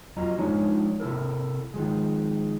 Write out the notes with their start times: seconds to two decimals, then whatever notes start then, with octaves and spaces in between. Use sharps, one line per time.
0.16 F2 F#3 F4 D#5 A#5
0.38 F3 G#3 D4 D#4 F4 C#5
1.00 C3 E4 A4 A#4
1.74 D#3 F3 G#3